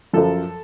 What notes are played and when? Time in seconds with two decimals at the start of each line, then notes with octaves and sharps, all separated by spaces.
0.13 F#2 F3 A4